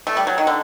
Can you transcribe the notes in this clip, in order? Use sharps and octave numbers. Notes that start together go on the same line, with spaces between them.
A3
G3
F#3
D#3
D3